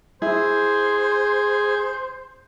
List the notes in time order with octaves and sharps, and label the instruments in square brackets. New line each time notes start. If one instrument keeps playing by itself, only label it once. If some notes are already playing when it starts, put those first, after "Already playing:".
[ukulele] E4 [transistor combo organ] G#4 [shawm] C5